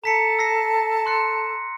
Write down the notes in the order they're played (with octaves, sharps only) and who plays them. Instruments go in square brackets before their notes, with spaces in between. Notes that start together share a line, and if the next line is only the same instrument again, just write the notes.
[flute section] A4 A5 [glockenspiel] A#5 B6 C#7
[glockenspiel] E6 A#6 C7
C6 F#6 C#7